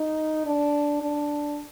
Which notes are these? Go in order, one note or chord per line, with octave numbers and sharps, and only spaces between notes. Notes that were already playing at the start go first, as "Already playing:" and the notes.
Already playing: D#4
D4
D4